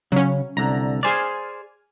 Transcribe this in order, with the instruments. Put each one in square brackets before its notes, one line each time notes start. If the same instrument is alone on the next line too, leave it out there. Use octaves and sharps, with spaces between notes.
[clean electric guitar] C#3 [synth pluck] F#3 C#4
[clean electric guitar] C2 D3 [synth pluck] A#5
[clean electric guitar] G#4 C5 D5 [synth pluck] G#5 F6